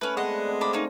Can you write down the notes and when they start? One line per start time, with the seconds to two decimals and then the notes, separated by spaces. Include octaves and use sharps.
0.01 A3 C#4 B4 A5 B5
0.17 G#3 B3 C4 D5 D#5 F#5
0.47 C4 D4
0.61 D4 C5 F5 B5 C6
0.73 A#3 C#4 D#4